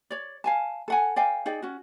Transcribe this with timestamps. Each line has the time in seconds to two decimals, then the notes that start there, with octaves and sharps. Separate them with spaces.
0.10 C#5 D5
0.44 F5 G#5 A5
0.88 A4 F#5 G#5
1.16 D5 F5 G5 G#5
1.46 D#4 G#4 D5 G5
1.62 C#4 F#4